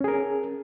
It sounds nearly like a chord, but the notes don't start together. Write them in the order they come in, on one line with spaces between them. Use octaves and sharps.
C#4 G#4 A#4